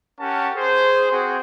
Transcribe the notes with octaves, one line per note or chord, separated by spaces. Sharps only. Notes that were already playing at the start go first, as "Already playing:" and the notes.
C#4 G4 A#4 F#5 A5
G#4 C5
C4 F#4 G#4